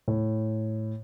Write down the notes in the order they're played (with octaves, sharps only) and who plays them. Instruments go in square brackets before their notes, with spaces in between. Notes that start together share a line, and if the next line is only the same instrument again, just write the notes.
[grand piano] A2